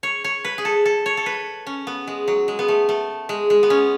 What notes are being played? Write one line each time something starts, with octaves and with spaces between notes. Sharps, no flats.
C#5
C#5
B4
G#4
A4
A4
C#5
A4
B4
C#4
B3
G#3
F#3
G#3
B3
A3
A3
G#3
G#3
B3
C#4